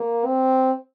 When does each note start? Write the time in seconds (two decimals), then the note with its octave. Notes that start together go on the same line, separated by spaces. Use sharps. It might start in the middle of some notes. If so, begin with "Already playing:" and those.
Already playing: A#3
0.25 C4